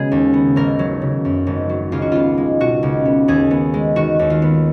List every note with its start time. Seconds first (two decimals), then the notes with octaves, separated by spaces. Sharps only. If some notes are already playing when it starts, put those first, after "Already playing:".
Already playing: C#3 G#3 B3 F#4 G#4
0.12 D#2
0.33 B3
0.56 G#1 A#4
0.79 F#3
1.02 C#3
1.25 F#2
1.47 G#1
1.69 F#3
1.92 C#2 F4
2.02 F#4
2.12 B3 F4
2.37 G#3
2.60 B2 F#4
2.83 C#2
3.05 B3
3.28 D#2 G#4
3.51 B3
3.74 G#3
3.96 D#3 F#4
4.19 D#2
4.30 F4
4.42 B3